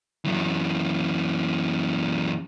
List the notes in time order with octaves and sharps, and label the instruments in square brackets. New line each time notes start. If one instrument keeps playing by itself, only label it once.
[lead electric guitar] F#2 E3